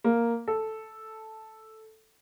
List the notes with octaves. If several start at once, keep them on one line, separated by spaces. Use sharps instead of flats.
A#3
A4